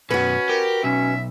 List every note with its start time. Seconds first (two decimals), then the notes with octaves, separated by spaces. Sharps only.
0.11 F#2 B2 C#4 F#4 B4
0.49 G4 A#4
0.84 B1 C#4 E5